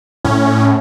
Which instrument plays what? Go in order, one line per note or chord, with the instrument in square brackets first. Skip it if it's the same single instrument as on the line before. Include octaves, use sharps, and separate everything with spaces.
[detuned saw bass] A2 [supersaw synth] C#4